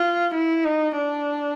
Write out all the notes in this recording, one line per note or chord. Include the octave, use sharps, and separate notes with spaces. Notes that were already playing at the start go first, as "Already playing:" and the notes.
Already playing: F4
E4
D#4
D4